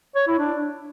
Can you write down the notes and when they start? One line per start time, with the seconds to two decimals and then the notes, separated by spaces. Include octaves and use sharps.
0.15 C#5
0.27 E4
0.39 D4